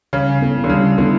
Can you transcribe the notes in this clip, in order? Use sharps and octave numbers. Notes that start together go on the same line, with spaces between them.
C#3 G3
B3 E4 A4
D3
C#3 G3
D3 B3 E4 A4